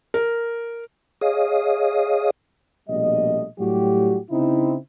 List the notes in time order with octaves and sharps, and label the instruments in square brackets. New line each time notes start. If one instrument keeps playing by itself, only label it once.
[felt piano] A#4
[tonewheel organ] G#4 C#5 D#5 F5 D#6
[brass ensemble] A#1 B2 G3 A3 D#5
A2 F#3 G3 F#4 G4
C#3 C4 D#4 E4